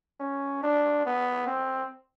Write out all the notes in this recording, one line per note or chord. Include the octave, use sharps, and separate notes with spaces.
C#4
D4
B3
C4